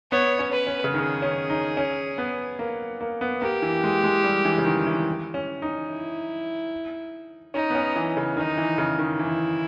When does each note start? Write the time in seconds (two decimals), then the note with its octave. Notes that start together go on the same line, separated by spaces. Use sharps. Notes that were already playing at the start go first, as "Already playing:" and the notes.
0.12 B3 C#5
0.39 C#4
0.53 B4
0.67 C#4
0.84 C#3
0.94 D#3 G#4
1.22 C#4
1.50 D#4
1.77 C#4
2.18 B3
2.59 A#3
3.01 A#3
3.21 B3
3.42 A#3 G4
3.62 E3
3.84 G#3
4.04 G#3
4.24 G3
4.45 E3
4.58 C#3
4.65 D#3
4.87 E3
5.34 C#4
5.62 D#4
5.89 E4
7.54 C#4 D#4
7.70 B3
7.75 C#4
7.96 E3
8.17 C#3
8.37 D#3 D#4
8.58 E3
8.78 C#3
8.99 D#3
9.19 E3 E4